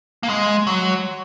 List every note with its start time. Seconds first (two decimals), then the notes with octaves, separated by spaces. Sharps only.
0.23 A#3
0.29 G#3
0.67 F#3